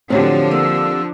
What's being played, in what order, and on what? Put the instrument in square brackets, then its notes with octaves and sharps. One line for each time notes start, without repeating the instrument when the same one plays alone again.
[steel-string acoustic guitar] A2 F#3 [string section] D3 F3 D4 [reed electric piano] C4 G4
[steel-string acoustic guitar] A#3 [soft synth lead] E6